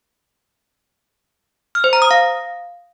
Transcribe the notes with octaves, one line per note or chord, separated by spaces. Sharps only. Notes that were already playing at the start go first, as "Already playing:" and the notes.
F6
C5
A#5
D#6
F5